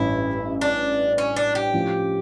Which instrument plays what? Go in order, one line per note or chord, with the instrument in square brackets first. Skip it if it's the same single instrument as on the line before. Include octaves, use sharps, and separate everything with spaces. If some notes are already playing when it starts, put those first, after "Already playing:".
Already playing: [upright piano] A1 G2 E3 C#4 [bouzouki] E4
[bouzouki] D4
C#4
D4
G4
[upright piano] A2 F3 C#4